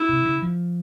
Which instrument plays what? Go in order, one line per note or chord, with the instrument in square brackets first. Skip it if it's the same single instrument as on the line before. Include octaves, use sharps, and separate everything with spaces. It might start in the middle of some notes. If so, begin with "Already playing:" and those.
Already playing: [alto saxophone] E4
[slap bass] C3
C#3
F3